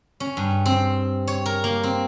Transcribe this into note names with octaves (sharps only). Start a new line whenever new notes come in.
C#4
G2
C4
C#5
A#4
A#3
C4